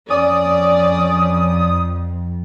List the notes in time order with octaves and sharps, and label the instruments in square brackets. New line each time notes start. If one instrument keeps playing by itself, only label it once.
[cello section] F2 [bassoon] C#4 [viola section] D5 [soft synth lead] D#6